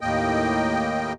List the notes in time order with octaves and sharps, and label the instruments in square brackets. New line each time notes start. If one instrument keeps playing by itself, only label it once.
[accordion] D#2 A2 A#3 D#5 G5